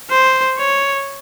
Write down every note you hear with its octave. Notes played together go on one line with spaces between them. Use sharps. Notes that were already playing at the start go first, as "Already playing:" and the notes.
C5
C#5